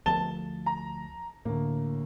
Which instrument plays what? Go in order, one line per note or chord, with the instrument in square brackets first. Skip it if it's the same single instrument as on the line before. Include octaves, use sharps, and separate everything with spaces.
[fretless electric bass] D2 F3 A3 [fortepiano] A5 [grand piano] G7
[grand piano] A#5
[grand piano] D2 A#3 [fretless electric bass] A2